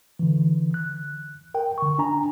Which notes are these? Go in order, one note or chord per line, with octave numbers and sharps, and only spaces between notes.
D3 E3
F#6
A#4 G5
D3 C#6
D4 G#5 A#5